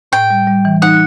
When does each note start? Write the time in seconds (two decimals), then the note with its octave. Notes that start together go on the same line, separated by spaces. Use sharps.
0.12 A2 G5
0.30 G3
0.47 G3
0.65 E3
0.82 D#4 F#5